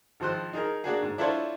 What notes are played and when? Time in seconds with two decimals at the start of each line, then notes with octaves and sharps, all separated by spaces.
0.20 G#1 F3 C5 F#6
0.53 D#4 G#4 A#4
0.84 A#3 D4 F#4 G#4
1.02 G#2
1.18 D4 E4 F4 A4 C5 C#5